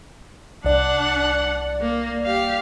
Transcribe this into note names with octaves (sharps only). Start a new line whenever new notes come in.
C2 D4 D5 F#5
A#3
G4 F5